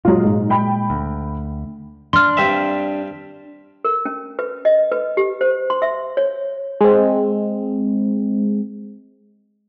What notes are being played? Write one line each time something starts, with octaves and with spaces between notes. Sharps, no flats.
A#2 F#3 G#3 F4
G#2
G5 B5
D2
D4 C6 F6
G2 C4 E5
A#4
C#4
B4
D#5
B4
G4
C5
C6
E5
C#5
G#3 C4